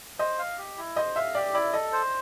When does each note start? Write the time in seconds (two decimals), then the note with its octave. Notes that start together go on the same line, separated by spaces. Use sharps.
0.19 C5 D#5
0.39 F5
0.58 G4
0.78 E4
0.96 C5 D#5
1.16 E5 F5
1.35 G4 D5
1.54 E4 D5
1.73 A4 D#5
1.93 C5